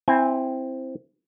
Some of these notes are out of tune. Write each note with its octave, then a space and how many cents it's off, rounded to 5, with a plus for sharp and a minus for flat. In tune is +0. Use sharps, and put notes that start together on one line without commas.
C4 +0 E4 +0 G#5 -25